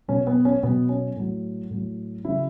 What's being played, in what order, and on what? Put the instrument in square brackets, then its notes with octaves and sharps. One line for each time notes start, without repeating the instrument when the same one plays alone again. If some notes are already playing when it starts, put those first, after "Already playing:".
[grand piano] B2 F#3 C#4
B3
C#4
B2 F#3 B3
C#4
A2 F#3
A2 F#3
C#3 F#3 E4